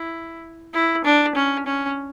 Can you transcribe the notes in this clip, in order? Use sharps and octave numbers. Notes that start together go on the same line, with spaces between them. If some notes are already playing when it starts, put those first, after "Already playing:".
Already playing: E4
E4
D4
C#4
C#4